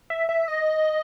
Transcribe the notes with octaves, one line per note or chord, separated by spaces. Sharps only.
E5
E5
D#5